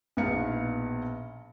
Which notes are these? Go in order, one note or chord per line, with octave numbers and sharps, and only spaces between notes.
A#1 B2 B3 D#4 F5 C#7